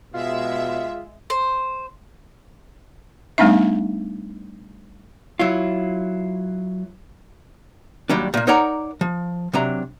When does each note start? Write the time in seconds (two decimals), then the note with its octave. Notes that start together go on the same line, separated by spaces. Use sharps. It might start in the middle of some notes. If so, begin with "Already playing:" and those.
0.14 B2 G#3 F4 E5
1.30 C5
3.38 G3 A3 B3 D4 D#4 E5
5.39 F#3 E4 F4
8.10 D#2 F#3 G3 D4
8.34 A#2 A#3
8.47 D#4 A#4 C#5 D5 F#5 A#5
9.01 F3
9.53 C3 F#3 D4 A#5